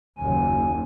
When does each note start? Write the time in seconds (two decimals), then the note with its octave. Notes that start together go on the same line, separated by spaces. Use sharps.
0.18 F#1 D#2 G#5